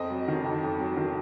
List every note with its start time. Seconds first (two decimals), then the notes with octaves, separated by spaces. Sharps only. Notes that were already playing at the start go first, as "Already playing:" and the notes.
Already playing: F2 C4 D#5
0.10 F#3
0.28 D#3
0.45 F2
0.63 F2
0.79 F#3
0.97 D#3